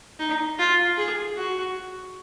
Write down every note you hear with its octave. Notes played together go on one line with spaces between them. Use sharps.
D#4
F4
G#4
F#4